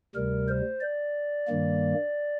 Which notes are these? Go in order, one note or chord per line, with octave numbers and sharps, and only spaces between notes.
D2 C3 G3 A#4
C5
D5
G2 D#3 G3 A#3